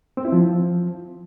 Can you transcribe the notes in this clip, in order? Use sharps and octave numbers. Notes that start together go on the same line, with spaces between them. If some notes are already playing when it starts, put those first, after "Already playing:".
C4
E4
F3